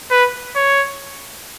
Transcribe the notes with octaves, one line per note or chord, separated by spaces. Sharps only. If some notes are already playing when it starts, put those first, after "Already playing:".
B4
C#5